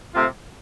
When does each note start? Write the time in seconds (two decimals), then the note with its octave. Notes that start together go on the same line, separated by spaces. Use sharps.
0.14 C3 A3 C4 F4